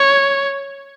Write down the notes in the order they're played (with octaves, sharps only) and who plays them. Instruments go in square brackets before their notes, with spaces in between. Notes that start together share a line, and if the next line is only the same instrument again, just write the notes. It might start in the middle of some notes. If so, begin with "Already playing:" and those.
Already playing: [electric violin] C#5